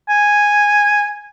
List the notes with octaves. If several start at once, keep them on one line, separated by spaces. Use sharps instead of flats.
G#5